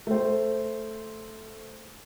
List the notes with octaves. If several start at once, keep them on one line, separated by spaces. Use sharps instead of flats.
A3 C5